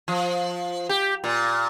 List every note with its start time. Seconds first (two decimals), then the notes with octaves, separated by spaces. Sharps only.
0.08 F3
0.89 G4
1.24 A#2